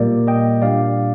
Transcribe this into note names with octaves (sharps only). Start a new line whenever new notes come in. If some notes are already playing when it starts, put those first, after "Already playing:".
Already playing: A#2 G3 A#3 A#4 D5
D#5 G5
A#2 G3 D4 D5 F5